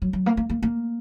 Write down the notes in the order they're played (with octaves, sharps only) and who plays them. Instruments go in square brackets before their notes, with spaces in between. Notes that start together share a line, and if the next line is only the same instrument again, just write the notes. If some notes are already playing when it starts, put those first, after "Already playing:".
[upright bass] F#3
F#3
A#3
A#3
A#3
A#3